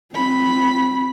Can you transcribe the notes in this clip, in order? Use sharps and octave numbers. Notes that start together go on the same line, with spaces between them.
C4 B5